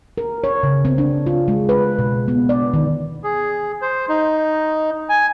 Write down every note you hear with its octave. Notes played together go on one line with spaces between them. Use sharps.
A#4
C#5
C#3
C4
D4
F4
G#3
B4
B2
B3
D5
D#3
G#4
C5
D#4
G#5